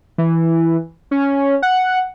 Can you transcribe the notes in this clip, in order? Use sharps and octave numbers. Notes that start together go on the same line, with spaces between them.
E3
C#4
F#5